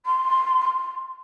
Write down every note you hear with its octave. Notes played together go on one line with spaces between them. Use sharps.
C6